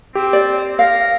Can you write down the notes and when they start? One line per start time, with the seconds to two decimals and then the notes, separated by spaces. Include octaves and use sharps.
0.15 C4 G4
0.33 D5
0.79 A#4 F5